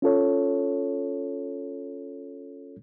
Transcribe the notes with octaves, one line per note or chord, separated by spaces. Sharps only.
C#4 F4 A4 C#5